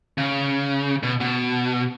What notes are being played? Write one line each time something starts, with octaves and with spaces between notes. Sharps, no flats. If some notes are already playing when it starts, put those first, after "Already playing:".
C#3
B2
B2